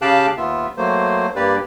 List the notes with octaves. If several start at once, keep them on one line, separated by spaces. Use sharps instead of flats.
C#3 G4 F5 G5 A5 F#6
D#2 B3 F4 E5
F#3 A3 A#3 C5
G2 A#3 G4 B4 D5